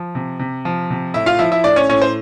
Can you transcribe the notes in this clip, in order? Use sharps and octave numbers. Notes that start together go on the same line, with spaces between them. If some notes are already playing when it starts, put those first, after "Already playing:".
Already playing: F3
C3
C3
F3
C3
A2 E4 E5
F4 F5
F3 E4 E5
E4 E5
A2 D4 D5
C#4 C#5
A2 C#4 C#5
C5